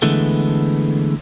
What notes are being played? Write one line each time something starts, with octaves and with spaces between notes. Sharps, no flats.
D3 E3 G#3 A3 B3